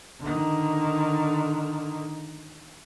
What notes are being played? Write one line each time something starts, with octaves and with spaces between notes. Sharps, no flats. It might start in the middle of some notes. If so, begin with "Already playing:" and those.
D3 D#3